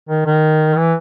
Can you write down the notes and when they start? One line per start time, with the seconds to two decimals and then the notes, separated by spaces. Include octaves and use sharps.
0.09 D#3
0.26 D#3
0.77 E3